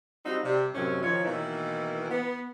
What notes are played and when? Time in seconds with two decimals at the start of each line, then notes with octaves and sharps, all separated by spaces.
0.26 G3 C4 D#4 F4 F#4
0.45 C3 G3
0.75 F#2 A2 C3 D#3 F#3 C#4
1.02 D#3 F3 C#5
1.25 B2 D#3 E3 A#3 D#4 E4
2.11 B3